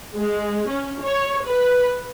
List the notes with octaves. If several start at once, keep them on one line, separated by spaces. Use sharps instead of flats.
G#3
C#4
C#5
B4